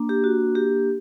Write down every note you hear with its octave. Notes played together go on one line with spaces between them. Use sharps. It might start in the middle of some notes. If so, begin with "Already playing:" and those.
Already playing: A#3 D4
G4
F#4
G4